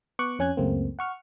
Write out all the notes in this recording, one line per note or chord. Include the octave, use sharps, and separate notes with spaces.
B3 C#6 D6 F#6
F2 C#4 G#5 F#6 G#6
C#2 F#2 C#3 A3 A#3 C4
F#5 C#6 F6